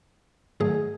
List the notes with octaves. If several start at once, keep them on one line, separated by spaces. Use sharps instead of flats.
G#2 D#3 F#3 A3 G#4